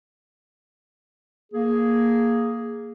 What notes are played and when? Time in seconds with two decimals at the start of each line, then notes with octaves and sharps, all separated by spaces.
1.52 A#3 G#4